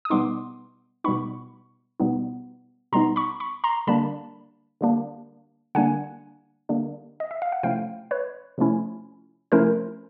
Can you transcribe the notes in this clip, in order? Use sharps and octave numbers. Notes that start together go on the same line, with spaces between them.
D#6
B2 G3 B3 D#4 C6 D6
B2 G3 B3 D#4 B5 C#6
B2 G3 B3 D#4
B2 G3 B3 D#4 A#5 C6
B5 C#6
B5 C#6
A#5 C6
D3 G3 A#3 D4 A5 B5
D3 G3 A#3 D4
D3 G3 A#3 D4 F#5 G#5
D3 G3 A#3 D4
D#5
E5
F5
F#5
C3 F3 A3 C#4 E4 F5 G5
B4 C#5
C3 F3 A3 C#4 E4
C3 F3 A3 C#4 E4 A#4 C5